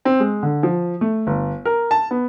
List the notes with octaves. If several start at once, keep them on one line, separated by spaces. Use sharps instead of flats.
C4
G#3
D3
F3
A3
G1
A#4
A5
B3